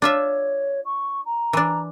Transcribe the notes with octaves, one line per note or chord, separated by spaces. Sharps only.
D4 F4 C#5 E5
C#6
A#5
E3 D4